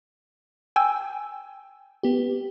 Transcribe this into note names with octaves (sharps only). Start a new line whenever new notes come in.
G5 G#5 E6
B3 G4